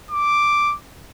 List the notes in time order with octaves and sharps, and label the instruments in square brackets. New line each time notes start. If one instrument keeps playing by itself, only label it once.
[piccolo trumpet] D6